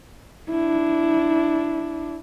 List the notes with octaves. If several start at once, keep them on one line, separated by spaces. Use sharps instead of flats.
D4 E4